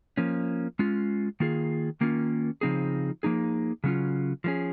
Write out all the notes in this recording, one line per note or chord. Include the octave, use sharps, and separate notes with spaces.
F3 A#3 C#4
G#3 C#4 F4
D#3 A#3 F4 G#4
D#3 A#3 C#4 F4
C#3 F3 C4 D#4 G#4
F3 A#3 D#4 G#4
C#3 F#3 C#4 F4
F3 G#3 C#4 G#4